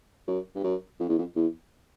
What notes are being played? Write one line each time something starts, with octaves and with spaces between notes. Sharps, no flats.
F#2
G2
F#2
F2
E2
F2
E2